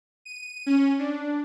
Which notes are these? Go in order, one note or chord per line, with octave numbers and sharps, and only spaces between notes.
D#7
C#4
D4